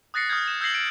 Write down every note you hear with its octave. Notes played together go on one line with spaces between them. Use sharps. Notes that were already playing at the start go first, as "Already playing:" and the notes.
D#6 F#6 A6 A#6 C7 C#7
D#6 F6 G6 G#6
E7
E6 G6 G#6 A#6 C7 F#7
D7